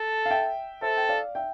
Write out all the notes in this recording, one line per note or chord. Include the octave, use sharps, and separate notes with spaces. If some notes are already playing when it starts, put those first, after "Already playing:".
Already playing: A4 A5
F5
E5 G5
A4 C5 E5
G5
D5 F5
E5 G5